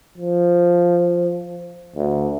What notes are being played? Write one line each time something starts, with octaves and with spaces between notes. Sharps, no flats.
F3
D2